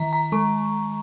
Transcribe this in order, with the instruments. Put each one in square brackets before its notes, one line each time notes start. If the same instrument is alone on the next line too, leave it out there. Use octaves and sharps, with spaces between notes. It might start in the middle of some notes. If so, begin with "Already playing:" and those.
Already playing: [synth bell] D#3 A#5
A#5
G#3 C#6